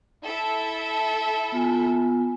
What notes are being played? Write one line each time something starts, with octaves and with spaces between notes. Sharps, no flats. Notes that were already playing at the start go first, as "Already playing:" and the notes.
E4 A4 E5
B3 F4 G#5